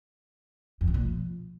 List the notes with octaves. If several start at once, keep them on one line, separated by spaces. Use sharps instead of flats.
F2
C3
A#2
F3